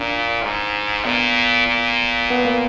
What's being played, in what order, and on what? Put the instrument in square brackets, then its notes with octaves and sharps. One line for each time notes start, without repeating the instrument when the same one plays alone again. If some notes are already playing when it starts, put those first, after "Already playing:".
Already playing: [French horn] A#2 [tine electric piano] D4
[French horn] G#2
[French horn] A#2 [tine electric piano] B3
[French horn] A#2
[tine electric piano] B3
A#3